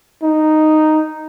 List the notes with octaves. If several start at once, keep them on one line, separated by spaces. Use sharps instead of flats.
D#4